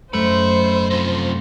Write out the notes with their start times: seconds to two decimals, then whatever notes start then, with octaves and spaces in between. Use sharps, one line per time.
0.14 F#2 A3 C5 D#5 B5
0.91 C3 F3